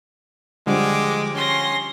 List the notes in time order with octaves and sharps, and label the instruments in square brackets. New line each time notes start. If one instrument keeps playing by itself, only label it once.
[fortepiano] D3 F3 G3 [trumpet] G#3 [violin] D6
[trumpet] C#4 [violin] C6 A#6